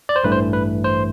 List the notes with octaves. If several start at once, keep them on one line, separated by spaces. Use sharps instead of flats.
D5
C5
A1 G2 E3 A3 B4
C5
B4
C5